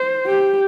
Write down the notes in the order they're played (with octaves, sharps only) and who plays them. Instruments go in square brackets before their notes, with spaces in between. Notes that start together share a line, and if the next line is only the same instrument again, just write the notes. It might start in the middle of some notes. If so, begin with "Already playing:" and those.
Already playing: [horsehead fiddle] C5
G4